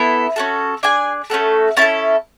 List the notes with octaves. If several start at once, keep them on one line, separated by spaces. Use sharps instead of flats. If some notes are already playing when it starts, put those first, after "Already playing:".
Already playing: B3 E4 A4
C#4 F#4 A4
D4 G#4 G#5
A3 C#4 F#4 A4
C#4 E4 A4 A5